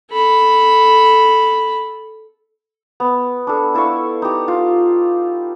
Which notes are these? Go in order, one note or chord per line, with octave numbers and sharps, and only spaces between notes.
A4 B5
B3
D4 A4
E4 A4 F5 C#6
D#4 G4
F4